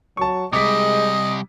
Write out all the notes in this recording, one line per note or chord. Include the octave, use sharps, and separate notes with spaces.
F#3 A5 C#6
C3 G3 G#3 D#5 D6 B6